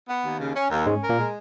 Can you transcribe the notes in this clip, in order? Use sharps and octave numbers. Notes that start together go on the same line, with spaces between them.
B3
D#2
C#3
C#4
D#2
G#2 G#3 C#4
A#4
A#2 A#3
G#3